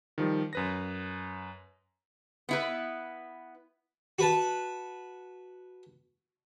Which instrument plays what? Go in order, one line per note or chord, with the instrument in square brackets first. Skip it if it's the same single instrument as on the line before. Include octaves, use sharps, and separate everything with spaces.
[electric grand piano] D#3 F3 G3
F#2 B4 A#6
[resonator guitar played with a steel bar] B3 E4 B4
[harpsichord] F#4 B4 A5